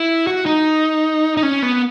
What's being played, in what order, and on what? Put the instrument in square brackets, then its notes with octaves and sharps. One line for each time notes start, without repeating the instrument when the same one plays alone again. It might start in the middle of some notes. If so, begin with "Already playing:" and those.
Already playing: [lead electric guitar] E4
F#4
D#4
D#4
C#4
B3